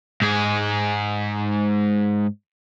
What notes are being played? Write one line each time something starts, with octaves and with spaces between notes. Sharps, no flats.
G#2 G#4